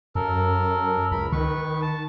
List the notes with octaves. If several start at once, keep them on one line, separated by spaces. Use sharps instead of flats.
F#2 A4 A#4
C#2 A#4 B5
D#3 B4 C#6
A5